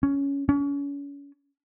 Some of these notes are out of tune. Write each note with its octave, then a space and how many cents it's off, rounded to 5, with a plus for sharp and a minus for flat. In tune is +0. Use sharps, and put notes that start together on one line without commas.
C#4 +10
C#4 +35